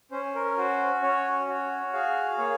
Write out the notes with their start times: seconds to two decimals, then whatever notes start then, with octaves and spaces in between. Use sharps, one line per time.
0.11 C#4 C5
0.35 A#4
0.57 F#4 C5
1.02 C#4 C#5
1.47 F#4 C#5
1.93 G#4 F5
2.38 A#3 C#5